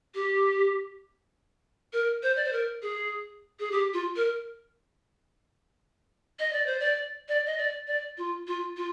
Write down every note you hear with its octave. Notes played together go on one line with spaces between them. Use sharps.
G4
A#4
C5
D5
C5
A#4
G#4
G#4
G4
F4
A#4
D#5
D5
C5
D5
D5
D#5
D5
D5
F4
F4
F4